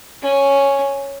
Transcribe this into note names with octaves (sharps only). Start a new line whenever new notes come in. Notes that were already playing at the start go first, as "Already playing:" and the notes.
C#4